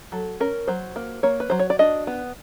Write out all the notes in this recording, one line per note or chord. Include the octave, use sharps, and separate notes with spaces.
F#3 A4
C#4 A#4
F#3 C5
A#3
A#3 C#5
B4
F#3 C5
C#5
D5
D4 D#5
B3